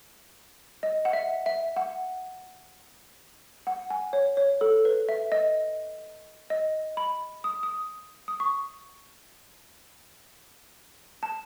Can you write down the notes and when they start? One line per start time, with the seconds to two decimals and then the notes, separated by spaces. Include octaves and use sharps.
0.83 D#5
1.05 F#5
1.13 E5
1.46 E5
1.76 F#5
3.67 F#5
3.90 G#5
4.13 C#5
4.37 C#5
4.61 A4
4.85 B4
5.09 E5
5.32 D#5
6.50 D#5
6.97 B5
7.44 D#6
7.63 D#6
8.28 D#6
8.40 C#6
11.23 A5